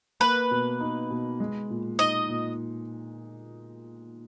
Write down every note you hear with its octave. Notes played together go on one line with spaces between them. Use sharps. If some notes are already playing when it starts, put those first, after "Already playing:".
A#3 B4
B2
D#4
B2
G#3
A#2
D#4 D#5
A#2